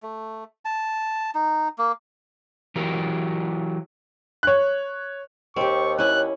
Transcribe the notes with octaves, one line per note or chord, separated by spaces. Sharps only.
A3
A5
D#4
A#3
E3 F#3 G4 A#4
C#5 F#6
D#2 C4 G4 C#6
C#4 E4 F#6